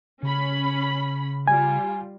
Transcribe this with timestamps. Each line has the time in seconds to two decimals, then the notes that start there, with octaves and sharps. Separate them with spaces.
0.23 C#3 C#4 B5
1.48 G3 F4 G#5